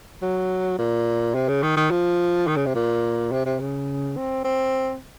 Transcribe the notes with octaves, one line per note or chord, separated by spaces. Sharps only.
F#3
A#2
C3
C#3
D#3
D#3
F3
D#3
C#3
C3
A#2
C3
C3
C#3
C4
C4